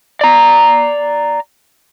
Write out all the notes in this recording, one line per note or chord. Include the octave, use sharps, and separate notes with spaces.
D5 A#5